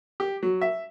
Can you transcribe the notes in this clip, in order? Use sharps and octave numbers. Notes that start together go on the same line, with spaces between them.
G4
F#3
E5